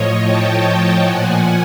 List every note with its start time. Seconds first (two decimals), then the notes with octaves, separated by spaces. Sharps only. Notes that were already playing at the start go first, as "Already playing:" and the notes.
Already playing: A2 F3 C#5 D#5
0.23 G5 A5
1.01 A#2 F3 F#5 G#5